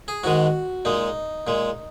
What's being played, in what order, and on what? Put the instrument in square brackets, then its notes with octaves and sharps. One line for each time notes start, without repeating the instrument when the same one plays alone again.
[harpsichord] G#4
G#2 D#3 G#3 F#4
A#2 G#3 D#4
A#2 G#3